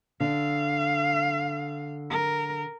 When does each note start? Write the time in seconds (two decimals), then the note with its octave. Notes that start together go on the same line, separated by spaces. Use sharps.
0.20 D3 F5
2.10 A#4